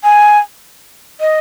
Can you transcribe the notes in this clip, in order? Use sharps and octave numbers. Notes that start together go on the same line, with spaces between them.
G#5
D#5